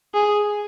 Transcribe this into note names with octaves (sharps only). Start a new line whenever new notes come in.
G#4